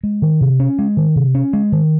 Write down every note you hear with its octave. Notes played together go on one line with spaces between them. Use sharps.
G#3
D#3
C3
C#4
G#3
D#3
C3
C#4
G#3
D#3